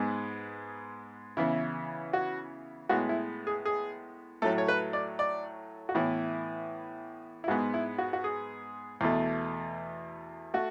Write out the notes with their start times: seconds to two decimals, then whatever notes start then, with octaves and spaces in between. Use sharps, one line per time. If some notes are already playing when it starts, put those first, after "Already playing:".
Already playing: G#2 G#3 B3
1.37 C#3 E3 B3 E4
2.13 F#4
2.89 A2 G#3 B3 F#4
3.09 E4
3.47 G#4
3.65 G#4
4.42 A2 F#3 A3 A4
4.58 C#5
4.68 B4
4.93 D5
5.19 D5
5.89 F#4
5.95 A2 E3 B3 E4
7.44 E4
7.48 G#2 G#3 B3 F#4
7.74 E4
7.98 F#4
8.13 F#4
8.24 G#4
9.01 E2 B2 A3
10.54 A3 F#4